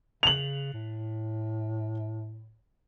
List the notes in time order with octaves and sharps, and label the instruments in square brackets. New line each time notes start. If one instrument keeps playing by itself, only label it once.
[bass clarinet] C#3 [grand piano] F7 F#7
[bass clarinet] A2